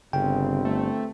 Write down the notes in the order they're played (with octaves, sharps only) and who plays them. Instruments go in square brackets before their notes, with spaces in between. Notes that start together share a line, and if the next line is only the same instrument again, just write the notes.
[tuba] G1 [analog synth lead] C#3 [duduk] C4 [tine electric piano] G5
[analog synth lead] A3